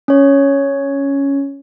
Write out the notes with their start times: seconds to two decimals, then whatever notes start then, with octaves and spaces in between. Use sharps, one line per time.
0.08 C#4 C#5